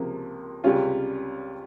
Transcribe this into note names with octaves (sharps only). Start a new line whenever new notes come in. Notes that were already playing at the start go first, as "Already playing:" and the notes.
Already playing: C#2 C3 F3 A#3
C#2 C3 G3 C#4 F4